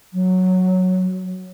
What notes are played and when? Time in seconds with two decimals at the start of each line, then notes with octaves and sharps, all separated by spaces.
0.13 F#3